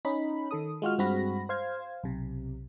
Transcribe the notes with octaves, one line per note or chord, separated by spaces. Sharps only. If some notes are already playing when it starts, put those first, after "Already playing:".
C#4 D#4 B5
D#3 A4 D#6
G#3 F4 F#4 F6
G2 G#3 C4 F#4 B5 A#6
C5 F5 G#6
B1 C3